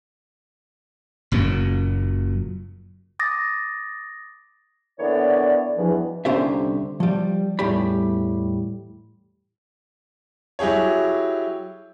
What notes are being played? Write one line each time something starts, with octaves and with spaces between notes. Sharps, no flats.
F#1 F#2 A#2 F#3
D6 D#6 A6 A#6
D3 E3 A#3 B3 C#5 D5
E2 G2 B2 E3 F3
C2 D3 C#4 G4 C5 E5
F3 G3
E2 A2 G3 G4 B5
F#3 E4 G4 G#4 C#5